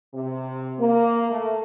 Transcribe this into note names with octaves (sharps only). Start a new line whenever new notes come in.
C3
A#3
A3